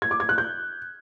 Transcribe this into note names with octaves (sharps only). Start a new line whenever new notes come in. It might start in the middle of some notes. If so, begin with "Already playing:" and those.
G#6
D6
G#6
F#6
G6